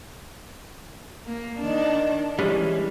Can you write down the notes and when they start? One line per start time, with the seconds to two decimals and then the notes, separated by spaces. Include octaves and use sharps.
1.26 A#3
1.60 D#3 D4
2.39 E3 G3 G#3 C#4